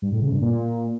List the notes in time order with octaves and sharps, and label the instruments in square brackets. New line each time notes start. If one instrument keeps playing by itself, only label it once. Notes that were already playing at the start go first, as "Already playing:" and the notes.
[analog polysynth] G2
A2
C#3
G2
A#2